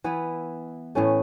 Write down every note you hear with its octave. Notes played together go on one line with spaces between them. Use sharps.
E3 B3 E4
A2 E3 A3 C#4